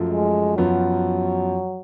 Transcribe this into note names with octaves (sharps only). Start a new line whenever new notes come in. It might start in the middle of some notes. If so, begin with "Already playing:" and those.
Already playing: F#2 F3 A3 F4
G#3
F#2 F3 F#3 B3 F4